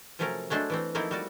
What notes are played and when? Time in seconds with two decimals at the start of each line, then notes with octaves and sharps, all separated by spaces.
0.19 C3 F3 F#3 A3 C#4 A#4
0.50 F#3 G#3 A3 D4 C5
0.70 E3 A3 C4
0.95 F3 A3 A#3 C4 D#4 E4
1.11 G3 F#4 D5